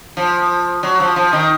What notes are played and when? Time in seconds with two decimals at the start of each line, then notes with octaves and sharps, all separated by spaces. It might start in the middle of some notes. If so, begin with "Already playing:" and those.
0.17 F3
0.83 F#3
1.00 F3
1.16 F3
1.33 D#3